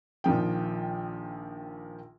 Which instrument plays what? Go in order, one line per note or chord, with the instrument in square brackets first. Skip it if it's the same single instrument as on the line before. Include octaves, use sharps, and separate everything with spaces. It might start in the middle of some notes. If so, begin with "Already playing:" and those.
[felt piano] A#1 D#3 F3 G5